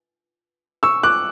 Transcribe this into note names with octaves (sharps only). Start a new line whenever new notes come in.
C#6 E6
D6 F#6